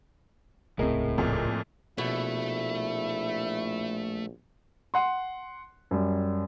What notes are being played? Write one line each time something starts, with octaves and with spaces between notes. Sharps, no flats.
D#1 C#2 A2 C4 G#4 A#4 D#5
F2 A#2
A#1 B2 A3 E4
F#5 C6
F#2 G3